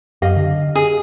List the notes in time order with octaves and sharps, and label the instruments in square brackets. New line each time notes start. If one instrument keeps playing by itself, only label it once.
[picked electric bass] F#2 [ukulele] G4 D#5 F5
[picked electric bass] D3
[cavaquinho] G#4